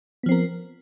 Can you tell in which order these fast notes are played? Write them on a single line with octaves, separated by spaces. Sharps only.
B3 F3 C4 A#4